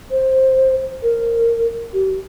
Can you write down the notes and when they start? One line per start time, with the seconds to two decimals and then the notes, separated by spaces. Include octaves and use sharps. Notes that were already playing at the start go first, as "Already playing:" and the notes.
0.11 C5
1.03 A#4
1.93 G4